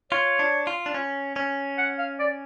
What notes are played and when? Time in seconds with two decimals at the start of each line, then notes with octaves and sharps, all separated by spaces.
0.11 F4 C#5
0.39 D4
0.67 F4
0.86 D4
0.94 C#4
1.36 C#4
1.78 F#5
1.99 F5
2.19 D5